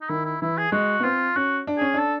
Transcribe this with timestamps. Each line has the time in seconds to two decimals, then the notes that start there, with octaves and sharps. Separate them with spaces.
0.01 D#4
0.09 D#3 E4
0.25 E4
0.41 E3 E4
0.58 G#4
0.72 G#3 F#4
1.00 B3
1.04 C4 F4
1.36 C#4 F#4
1.67 D4
1.77 C#4 G#4
1.94 D4 A4